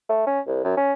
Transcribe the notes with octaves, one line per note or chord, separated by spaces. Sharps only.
A3
C#4
C2
F#2
C#4